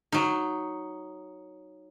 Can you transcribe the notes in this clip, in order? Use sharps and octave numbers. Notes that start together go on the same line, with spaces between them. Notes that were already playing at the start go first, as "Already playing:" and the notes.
F#3 D#4